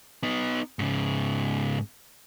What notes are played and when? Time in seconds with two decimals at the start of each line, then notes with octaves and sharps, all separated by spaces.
0.23 B3 D#4
0.79 G#2 C#3